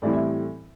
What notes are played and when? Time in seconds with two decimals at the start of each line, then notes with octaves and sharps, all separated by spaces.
0.02 A2 E3 G3 C4 E4 D5
0.13 E5